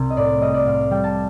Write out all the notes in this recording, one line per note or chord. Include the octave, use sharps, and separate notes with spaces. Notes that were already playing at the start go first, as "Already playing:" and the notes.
Already playing: C2 C3
D#5
A2 D5
G3 D#5
D5
A2 F5
G3 G5
A5